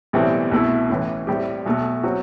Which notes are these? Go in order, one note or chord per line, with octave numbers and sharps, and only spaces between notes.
B1 A2 E3 G3 C4
C2 B2 A3 E4
A1 A2 E3
A2 G3 C4 G4
B1 B2 A3
F#3 C4 F#4